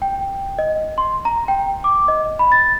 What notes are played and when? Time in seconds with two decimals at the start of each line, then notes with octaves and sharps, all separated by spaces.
0.02 G5
0.58 D#5
0.98 C6
1.25 A#5
1.48 G5
1.84 D6
2.08 D#5
2.39 B5
2.52 A6